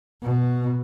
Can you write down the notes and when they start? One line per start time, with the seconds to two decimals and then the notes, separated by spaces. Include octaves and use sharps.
0.23 B2